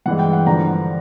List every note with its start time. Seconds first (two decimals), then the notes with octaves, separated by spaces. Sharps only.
0.06 G2 E3 G#3 F#5
0.19 G5
0.33 F#5
0.46 G2 D3 F3 A#5